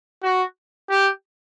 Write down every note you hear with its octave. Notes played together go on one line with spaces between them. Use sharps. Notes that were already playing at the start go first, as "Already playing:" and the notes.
F#4
G4